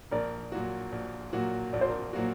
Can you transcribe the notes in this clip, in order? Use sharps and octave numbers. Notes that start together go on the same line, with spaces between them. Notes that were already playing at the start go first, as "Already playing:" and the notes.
A#1 A#4 D5
A#2 F#3 A#3 F#4
A#1
A#2 F#3 A#3 F#4
A#1 D5
C5
A#4 D5
A#2 F#3 A#3 F#4